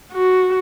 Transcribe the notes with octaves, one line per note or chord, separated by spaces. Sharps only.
F#4